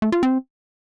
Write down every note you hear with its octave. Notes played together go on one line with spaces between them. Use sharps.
A3
F4
C4